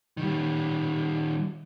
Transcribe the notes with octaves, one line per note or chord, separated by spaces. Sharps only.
D#3 G3